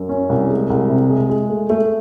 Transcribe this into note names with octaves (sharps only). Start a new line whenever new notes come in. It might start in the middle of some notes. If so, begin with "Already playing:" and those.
Already playing: F#2
C#4
C2
G#3
C2
C3
G#3
G#3
A3
A3